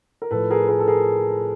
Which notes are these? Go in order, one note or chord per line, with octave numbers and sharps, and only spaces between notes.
A#4
A2 F3 A4 B4
G#4 A#4
G#4 A#4
A4
G#4 A#4